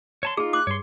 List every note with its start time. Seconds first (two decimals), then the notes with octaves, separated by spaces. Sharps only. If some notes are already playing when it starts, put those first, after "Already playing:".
0.23 C#5 A5 C6
0.37 D#4 F4 G#4
0.53 D6 F#6
0.67 G2 C#5 C6